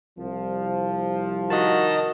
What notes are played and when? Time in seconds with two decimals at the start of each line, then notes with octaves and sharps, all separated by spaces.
0.18 C2 F3
1.50 D#3 F#4 D#5 A5